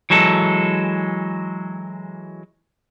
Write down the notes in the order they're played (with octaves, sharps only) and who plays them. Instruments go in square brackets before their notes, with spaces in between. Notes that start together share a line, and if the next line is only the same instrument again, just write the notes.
[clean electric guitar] E3 F#3 G#3 A4